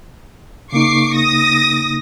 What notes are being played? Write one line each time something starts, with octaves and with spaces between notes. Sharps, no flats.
C#3 A#3 D#4 C#6 D6 C7
D#6 A#6